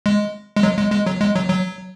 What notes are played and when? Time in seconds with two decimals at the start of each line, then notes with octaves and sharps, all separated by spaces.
0.06 G#3
0.56 G#3
0.63 F#3
0.78 G#3
0.92 G#3
1.06 F#3
1.21 G#3
1.36 F#3
1.49 F#3